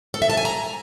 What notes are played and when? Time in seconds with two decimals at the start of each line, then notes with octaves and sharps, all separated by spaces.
0.14 A4
0.22 E5
0.30 A5
0.37 G#5
0.45 A#5